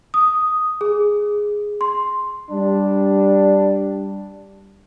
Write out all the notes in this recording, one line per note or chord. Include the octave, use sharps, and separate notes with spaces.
D#6
G#4
C6
G3 D4